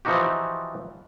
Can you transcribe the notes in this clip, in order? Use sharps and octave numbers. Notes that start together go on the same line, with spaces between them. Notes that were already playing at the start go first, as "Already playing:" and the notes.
E3 F3 C4 D#4 F#4 G4